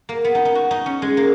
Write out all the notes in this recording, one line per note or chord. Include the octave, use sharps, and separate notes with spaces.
A#3
B3
D#4
D#4
F#4
D#4
C#4
G#3
A#3